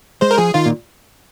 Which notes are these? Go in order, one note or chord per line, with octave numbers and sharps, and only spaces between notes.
G#3 C5
A#4
F3 G#4
D#3 F4
A#2